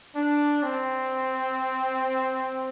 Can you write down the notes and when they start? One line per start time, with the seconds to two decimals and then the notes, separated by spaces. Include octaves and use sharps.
0.16 D4
0.63 C4